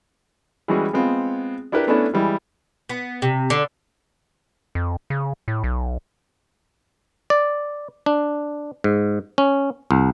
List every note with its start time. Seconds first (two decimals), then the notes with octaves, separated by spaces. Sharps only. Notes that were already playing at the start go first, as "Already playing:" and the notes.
0.68 E3 G3 G#3 C#4 F#4 G#4
0.93 G#3 B3 C4 F4
1.72 D4 E4 G4 A#4 B4
1.87 A3 B3 C#4 D4 E4
2.14 E3 G3 G#3 E4
2.89 B3
3.22 C3
3.50 D3
4.75 F2
5.10 C#3
5.48 A2
5.64 B1
7.30 D5
8.06 D4
8.84 G#2
9.38 C#4
9.91 C2